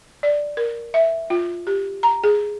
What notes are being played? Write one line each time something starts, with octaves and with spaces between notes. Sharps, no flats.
D5
A#4
E5
F4
G4
A#5
G#4